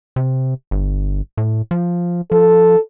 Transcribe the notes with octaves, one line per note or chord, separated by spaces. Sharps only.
C3
G1
A2
F3
F3 A4